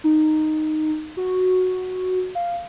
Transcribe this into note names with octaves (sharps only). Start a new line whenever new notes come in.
D#4
F#4
F5